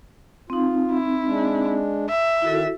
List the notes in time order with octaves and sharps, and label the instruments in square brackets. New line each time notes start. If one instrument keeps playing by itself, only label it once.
[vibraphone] C4 D#4 [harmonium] F4
[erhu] E4
[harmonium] G#3 D4
[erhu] E5
[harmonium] D#3 [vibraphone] E4 F#4 A4